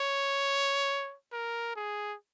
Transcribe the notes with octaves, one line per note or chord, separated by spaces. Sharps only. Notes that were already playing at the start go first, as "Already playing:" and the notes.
Already playing: C#5
A#4
G#4